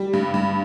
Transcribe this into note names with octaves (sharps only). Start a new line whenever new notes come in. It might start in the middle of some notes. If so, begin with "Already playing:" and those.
Already playing: G3
G2
G2